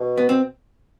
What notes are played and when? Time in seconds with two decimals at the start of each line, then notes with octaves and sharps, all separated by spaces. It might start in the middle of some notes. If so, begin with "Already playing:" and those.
Already playing: B2
0.17 B3
0.29 C4